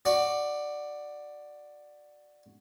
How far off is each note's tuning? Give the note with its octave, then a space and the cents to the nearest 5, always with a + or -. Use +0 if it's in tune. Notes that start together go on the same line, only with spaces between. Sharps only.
F#4 +0 D5 +10